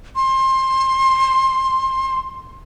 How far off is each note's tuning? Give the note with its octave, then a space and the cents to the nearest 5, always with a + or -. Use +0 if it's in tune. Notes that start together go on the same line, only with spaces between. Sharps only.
C6 +20